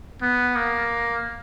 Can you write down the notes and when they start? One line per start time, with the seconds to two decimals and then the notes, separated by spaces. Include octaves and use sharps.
0.22 B3
0.56 A#3